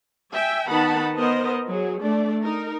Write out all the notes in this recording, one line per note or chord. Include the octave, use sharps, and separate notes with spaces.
E5 G5 G#5
D#3 B3 D#4 F#5 A5 B5
B3 A#4 C5 D#5
F#3 G#4
A3 D4 D5
D#4 A#4